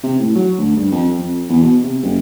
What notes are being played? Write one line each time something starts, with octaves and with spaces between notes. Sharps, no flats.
C3
A2
F#3
D2
G2
F2
F2
E2
B2
C3
F#1